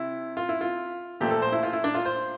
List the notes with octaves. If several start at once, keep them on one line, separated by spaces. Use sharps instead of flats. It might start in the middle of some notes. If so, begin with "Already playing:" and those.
Already playing: C3 E4
F4
E4
F4
A#2 F3 A3 G4
A4
C5
E4
F4
E4
D4
F4
C5